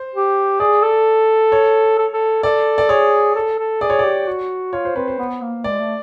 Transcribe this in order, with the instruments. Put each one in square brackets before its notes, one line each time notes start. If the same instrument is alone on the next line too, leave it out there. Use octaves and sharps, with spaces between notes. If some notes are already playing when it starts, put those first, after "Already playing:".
Already playing: [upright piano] C5
[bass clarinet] G4
[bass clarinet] G#4 [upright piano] D5
[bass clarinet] A4
[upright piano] C#5
[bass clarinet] A4
A4
[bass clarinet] A4 [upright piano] D5
[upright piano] D5
[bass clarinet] G#4 [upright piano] C#5
[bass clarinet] A4
A4
[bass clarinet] G#4 [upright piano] D5
[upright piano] C#5
D5
[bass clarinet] G4
F#4
[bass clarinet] F4 [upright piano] C#5
[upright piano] C5
[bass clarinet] C4 [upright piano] B4
[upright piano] C5
[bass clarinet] B3
A#3
[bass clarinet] G#3 [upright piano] D5
[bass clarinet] A3